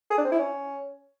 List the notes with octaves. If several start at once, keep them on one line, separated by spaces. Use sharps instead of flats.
G#4
D4
C4
E4
C#4